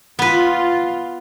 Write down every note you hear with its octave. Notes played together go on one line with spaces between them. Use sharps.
B3 F4 B4